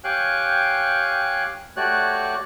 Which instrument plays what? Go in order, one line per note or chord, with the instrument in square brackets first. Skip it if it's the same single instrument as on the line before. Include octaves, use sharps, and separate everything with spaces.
[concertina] G4 C#5 F5 G5 G#5 F#6
A3 F#4 G4 C#5 D5 F#6